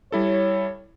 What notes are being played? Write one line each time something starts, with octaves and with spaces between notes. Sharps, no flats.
G3 E4 A4 C#5